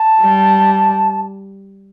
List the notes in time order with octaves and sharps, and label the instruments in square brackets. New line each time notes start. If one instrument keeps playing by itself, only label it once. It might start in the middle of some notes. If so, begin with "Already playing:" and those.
Already playing: [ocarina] A5
[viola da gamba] G3